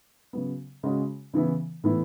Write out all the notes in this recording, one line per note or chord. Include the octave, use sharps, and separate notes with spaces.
C#3 F#3 B3
C#3 G#3 C#4 F#4
C#3 E3 B3 E4
A2 E3 B3 E4